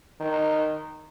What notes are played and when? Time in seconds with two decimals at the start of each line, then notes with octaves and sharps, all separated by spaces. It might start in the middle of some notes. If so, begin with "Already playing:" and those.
0.20 D#3